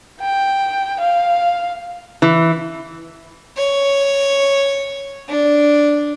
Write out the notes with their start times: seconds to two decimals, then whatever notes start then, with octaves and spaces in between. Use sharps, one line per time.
0.20 G5
1.00 F5
2.22 E3
3.57 C#5
5.29 D4